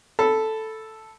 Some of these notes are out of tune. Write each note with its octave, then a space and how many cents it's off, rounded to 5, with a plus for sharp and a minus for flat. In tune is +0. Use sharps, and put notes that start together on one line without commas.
A4 +0 B5 +0